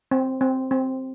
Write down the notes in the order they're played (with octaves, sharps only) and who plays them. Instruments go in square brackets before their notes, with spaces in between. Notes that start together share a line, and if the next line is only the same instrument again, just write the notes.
[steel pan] C4
C4
C4